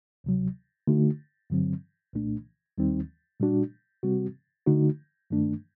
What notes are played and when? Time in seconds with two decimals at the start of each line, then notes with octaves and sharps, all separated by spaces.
0.24 D2 C3 F#3
0.87 D3 A3 D#4 F#4
1.50 G2 D3 F#3 C4
2.13 C2 A#2 A3 D4
2.78 D#2 D#3 G3 C4 D#4
3.40 A#2 G3 D4 F#4
4.03 C3 G3 C4 F#4
4.66 D3 A3 D#4 F#4
5.30 G2 D#3 A3 D4